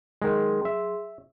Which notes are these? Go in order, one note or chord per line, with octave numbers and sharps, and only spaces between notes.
D#3 F#3 G#3 G#4 C6
E5